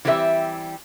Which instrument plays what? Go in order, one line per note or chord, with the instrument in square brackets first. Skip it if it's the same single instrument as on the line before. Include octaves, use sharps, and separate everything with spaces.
[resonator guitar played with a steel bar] E3 G3 C4 G4 A#4 E5